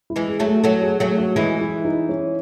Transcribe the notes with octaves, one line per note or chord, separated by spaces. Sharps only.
E4
E3 G#3
G#4
F#3 A3
A4
F#3 A3 A4
G#4
F#3 A3 G#4
F#4
E3 G#3 E4
E4
D#4
C#4